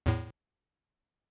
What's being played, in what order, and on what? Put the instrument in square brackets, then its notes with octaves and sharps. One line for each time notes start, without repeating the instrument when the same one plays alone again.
[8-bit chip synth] E2 A2